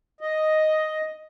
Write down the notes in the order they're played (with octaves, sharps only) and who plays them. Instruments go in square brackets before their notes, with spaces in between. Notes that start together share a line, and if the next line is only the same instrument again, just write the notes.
[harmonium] D#5